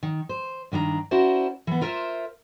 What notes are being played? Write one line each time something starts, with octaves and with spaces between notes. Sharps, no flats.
D#3
C5
G2 D#3 D4 A#5
C#4 E4 F#4 A#4 C5 D5
E3 B3
F4 A#4 C5 E5